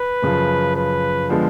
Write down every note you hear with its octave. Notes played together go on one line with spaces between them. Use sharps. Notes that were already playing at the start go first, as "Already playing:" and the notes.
Already playing: B4
F#2 C#3 F3
B4
D3 F3 G#3 B3